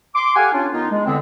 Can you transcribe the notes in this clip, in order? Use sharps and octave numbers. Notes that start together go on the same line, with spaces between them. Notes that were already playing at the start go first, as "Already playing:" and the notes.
C6 D6
G4 A4 F5 F#5 G#5
C#4 D4 F4
D#3 B3 D#4 F4
G#3
E2 D3 B3 C4